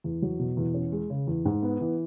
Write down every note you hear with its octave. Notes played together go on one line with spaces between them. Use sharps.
E2
F#3
B2
E2
C#4
G#3
C#3
E2
G#2
B3
E3